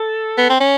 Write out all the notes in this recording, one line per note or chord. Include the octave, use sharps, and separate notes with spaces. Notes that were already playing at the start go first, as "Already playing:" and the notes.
Already playing: A4
B3
C4
C#4